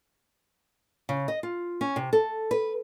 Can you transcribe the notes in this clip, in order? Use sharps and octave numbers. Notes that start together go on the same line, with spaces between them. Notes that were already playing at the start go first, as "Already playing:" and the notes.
C#3
D#5
F4
C#4
C3
A4
B4